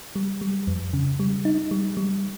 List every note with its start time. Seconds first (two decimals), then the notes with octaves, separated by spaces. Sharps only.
0.16 G3
0.41 G3
0.67 F2
0.93 C#3
1.20 G3
1.45 D#4
1.71 G3
1.97 G3